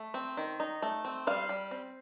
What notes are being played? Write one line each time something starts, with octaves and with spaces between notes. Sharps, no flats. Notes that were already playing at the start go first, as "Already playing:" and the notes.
Already playing: A3
C4
D#3
D#4
A3
C4
G3 F5
G3
C4